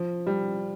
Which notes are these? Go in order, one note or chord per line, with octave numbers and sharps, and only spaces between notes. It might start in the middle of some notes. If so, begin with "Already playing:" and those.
Already playing: F3
G3